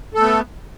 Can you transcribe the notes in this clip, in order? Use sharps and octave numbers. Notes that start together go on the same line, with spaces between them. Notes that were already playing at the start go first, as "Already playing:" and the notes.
A3 B3 A4